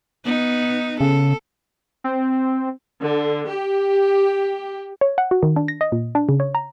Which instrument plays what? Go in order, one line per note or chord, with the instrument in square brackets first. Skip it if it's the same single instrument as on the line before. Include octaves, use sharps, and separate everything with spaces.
[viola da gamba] B3 D#4
[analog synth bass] C#3 [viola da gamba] A4
[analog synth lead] C4
[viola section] D3
G4
[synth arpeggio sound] C#5
F#5
F#4
D#3
D4
A#6
D#5
A#2
D4
C#3
C#5
A#5